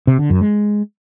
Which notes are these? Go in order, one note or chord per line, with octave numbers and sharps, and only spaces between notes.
C3
D3
F#2
G#3